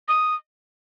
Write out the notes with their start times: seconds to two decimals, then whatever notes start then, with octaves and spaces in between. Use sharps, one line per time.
0.08 D#6